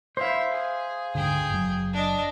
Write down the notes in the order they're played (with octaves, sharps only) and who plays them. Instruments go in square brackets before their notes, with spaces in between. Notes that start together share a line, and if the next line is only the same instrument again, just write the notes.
[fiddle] E4 E5 [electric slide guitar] C5 F5
[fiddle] G#4
[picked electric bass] D2 G#2 D3 [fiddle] G#4 G5
[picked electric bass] F#1 F#3
[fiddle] D4 D#5